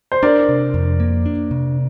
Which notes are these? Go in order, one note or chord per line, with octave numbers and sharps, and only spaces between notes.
C5
D4 A#4 D5
C3
F2
A#3
D4
C3